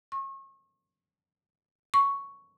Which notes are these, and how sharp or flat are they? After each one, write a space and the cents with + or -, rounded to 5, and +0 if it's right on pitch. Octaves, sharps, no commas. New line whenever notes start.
C#6 -35
C#6 +5